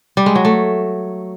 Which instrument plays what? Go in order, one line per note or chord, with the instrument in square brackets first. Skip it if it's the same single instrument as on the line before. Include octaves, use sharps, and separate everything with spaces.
[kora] G3
G#3
F#3
A3